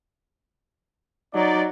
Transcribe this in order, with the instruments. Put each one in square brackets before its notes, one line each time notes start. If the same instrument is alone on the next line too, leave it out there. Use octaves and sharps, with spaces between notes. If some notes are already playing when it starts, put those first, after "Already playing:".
[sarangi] F#3 [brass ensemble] D#4 D5